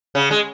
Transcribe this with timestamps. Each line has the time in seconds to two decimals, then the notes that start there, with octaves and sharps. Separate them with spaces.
0.15 C#3
0.31 G#3